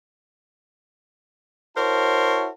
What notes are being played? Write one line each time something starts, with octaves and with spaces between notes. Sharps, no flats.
E4 F#4 A#4 C5 C#5 A5